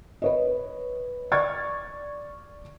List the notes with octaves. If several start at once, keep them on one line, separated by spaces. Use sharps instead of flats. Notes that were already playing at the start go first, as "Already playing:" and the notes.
B4 C#5 D#5
D5 C#6 F6 G#6 A6